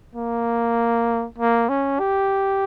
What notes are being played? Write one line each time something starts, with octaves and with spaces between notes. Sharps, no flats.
A#3
A#3
C#4
G4